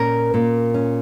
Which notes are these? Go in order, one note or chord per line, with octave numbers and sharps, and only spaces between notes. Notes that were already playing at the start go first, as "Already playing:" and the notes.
Already playing: A#2 C#4 A#4
A#2
C#4